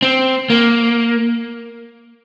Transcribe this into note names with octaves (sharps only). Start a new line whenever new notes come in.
C4
A#3